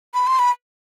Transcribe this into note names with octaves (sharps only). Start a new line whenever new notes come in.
B5
C6
B5